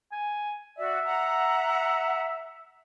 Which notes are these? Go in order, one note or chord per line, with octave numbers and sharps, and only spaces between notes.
G#5
F#4 D5 E5
F#5 A#5